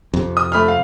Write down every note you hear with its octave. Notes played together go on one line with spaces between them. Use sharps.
F2 C3
D#6
A3 B5 F6
F5